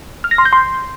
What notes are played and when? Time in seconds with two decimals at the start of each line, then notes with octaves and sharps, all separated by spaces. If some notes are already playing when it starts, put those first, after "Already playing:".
0.24 F6
0.31 A#6
0.38 C6
0.45 G6
0.53 C6